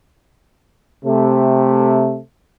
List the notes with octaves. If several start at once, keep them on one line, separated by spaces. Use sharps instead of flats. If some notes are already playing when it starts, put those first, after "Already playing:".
C3 A3